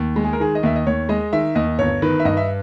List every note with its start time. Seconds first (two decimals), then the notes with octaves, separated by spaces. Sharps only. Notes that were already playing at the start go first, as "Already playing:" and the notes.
Already playing: D#2
0.16 G#3
0.25 G#4
0.33 A#4
0.40 D#3 G#4
0.55 D#5
0.63 D#2 E5
0.76 D#5
0.87 D#2 C#5
1.09 G#3 D#5
1.33 D#3 E5
1.55 D#2 D#5
1.79 G1 C#5
2.02 D#3 B4
2.20 E5
2.25 G2 D#5
2.37 E5